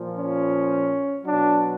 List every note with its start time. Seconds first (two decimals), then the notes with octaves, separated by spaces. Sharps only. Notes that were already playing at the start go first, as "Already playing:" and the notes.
Already playing: A#2 F3
0.15 C#4
1.26 B2 F#3 D4